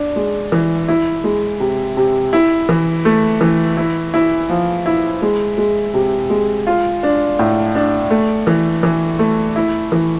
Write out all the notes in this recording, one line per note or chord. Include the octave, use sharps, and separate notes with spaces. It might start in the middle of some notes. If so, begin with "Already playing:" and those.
Already playing: D4
G#3
E3
E4
G#3
C3
C3
E4
E3
A3
E3
E4
E4
F3
E4
G#3
G#3
C3
G#3
F4
D4
A2
D4
A3
E3
E3
A3
E4
E3